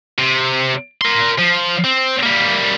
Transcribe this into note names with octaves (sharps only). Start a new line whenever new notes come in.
C3
A#4 C6
F3
C4
G3 A#3